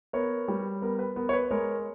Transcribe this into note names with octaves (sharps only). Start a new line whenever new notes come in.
B3 A#4 C#5
G3
B3 A#4
B4
B3 A#4
C#5
B4
G#3 A#4 C#5